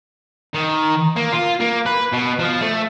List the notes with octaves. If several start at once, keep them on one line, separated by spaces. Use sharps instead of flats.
D#3
A#3
F4
A#3
B4
B2
F3
A3